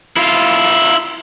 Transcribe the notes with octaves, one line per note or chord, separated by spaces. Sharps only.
E4 F4